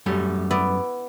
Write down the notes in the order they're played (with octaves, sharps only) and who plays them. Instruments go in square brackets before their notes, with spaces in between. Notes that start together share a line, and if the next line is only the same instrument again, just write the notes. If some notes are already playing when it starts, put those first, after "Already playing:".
[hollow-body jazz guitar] F#2 G3 A3
[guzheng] B3 E4 D5